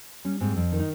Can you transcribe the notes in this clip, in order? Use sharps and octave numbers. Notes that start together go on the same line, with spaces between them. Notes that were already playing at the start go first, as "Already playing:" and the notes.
G3 C#4
G#2 C4
F2
D#3
D#4